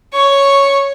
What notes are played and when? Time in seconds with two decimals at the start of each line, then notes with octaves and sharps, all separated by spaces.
0.13 C#5 C#6